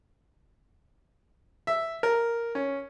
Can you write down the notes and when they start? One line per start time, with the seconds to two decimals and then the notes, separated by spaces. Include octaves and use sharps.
1.67 E5
2.03 A#4
2.55 C#4